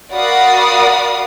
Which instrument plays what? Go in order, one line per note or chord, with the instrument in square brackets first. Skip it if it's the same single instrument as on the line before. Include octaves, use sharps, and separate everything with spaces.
[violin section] F#4 A#4 D5 F5 B5 D#6